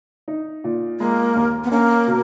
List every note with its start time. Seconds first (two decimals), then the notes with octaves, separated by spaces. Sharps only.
0.28 D#4
0.64 A#2
1.00 G#3 A#3
1.35 D#2
1.64 B3
1.71 A#3 C#4
2.07 B2